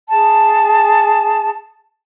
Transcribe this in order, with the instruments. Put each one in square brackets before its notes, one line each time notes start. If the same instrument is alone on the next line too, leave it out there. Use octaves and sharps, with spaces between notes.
[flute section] G#4 A5